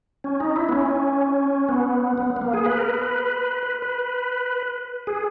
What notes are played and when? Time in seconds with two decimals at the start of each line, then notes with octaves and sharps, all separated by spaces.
0.24 C#4
0.40 D#4
0.56 E4
0.69 B3
0.72 C#4
1.69 B3
2.18 B3
2.36 B3
2.41 A#3
2.53 G#4
2.66 B4
2.77 A#4
2.89 B4
3.02 B4
3.63 B4
3.82 B4
5.07 G#4